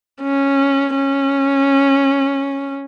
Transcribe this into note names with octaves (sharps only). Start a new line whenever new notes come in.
C#4
C#4